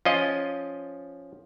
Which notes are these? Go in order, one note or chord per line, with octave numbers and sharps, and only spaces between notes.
F3 C#4 F4 D#5